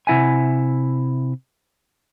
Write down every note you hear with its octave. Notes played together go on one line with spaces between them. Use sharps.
C3 D4 E4 E5 F#5 G#5